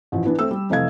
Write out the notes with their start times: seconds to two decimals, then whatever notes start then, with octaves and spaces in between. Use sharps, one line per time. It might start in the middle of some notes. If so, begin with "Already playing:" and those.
0.12 A1 E3 F3
0.25 E3 B3 D4
0.39 A3 C4 E6
0.51 G3
0.70 F1 E3 A3 D#5 F5 G#6